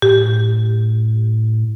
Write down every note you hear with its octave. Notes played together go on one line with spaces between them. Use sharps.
A2 G4